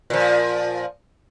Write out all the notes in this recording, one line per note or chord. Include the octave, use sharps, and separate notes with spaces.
A#2 F3